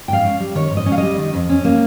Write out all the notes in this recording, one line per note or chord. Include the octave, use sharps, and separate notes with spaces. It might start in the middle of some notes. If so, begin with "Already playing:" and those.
G#2 F5 G5
C#4
G3
D#3 C#5
G#2
D#5
C#4
F5
G3 D#5
D#3
F2
C#4
A#3